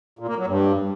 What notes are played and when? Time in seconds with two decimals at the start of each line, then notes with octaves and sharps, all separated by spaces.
0.19 A#2
0.29 A#3
0.38 F#3
0.48 G2